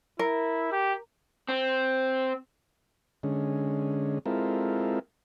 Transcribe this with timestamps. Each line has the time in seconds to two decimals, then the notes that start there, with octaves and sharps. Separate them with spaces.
0.19 E4 A#4
0.72 G4
1.49 C4
3.23 D3 G#3 C#4
4.26 G#3 C4 E4 F4 A4 A#4